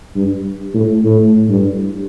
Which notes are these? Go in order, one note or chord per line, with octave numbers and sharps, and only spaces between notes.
G2
A2
A2
G2